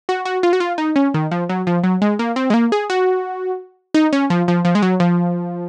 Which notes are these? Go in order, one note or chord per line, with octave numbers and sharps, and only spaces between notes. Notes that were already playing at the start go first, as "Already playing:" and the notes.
F#4
F#4
F4
F#4
F4
D#4
C#4
D#3
F3
F#3
F3
F#3
G#3
A#3
C4
G#3
A#3
G#4
F#4
D#4
C#4
F3
F3
F3
G#3
F#3
F3